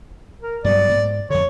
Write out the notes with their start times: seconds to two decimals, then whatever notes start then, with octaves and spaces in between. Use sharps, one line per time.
0.41 A#4
0.64 G2 F#3 B3 D5
0.89 G#2
1.30 F2 D3 C#5